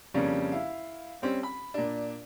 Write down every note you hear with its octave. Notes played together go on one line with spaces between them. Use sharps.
F2 C#3 G3 A#3 C#4 D4
E4 F5
G3 C4 C#4
B5
A#2 D4